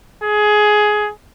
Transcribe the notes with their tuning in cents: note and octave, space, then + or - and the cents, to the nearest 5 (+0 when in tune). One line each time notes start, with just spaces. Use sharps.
G#4 +15